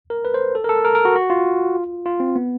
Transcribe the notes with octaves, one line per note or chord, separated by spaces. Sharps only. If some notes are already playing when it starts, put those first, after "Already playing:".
A#4
B4
C5
A4
A#4
A4
A#4
A#4
F#4
F#4
F4
F4
C4
B3